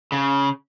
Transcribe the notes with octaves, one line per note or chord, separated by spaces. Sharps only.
C#3